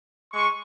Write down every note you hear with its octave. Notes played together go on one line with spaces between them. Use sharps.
G#3 C#6